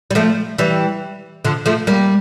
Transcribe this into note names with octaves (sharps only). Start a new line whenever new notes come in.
G3
F3 A3
E3 G3
D3 F3
F3 A3
G3 A#3